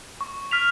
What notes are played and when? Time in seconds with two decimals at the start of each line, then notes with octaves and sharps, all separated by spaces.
0.21 C#6
0.51 F6 B6 F7